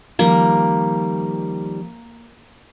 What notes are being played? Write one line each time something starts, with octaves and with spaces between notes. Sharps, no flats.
D#3 F3 G3 A#3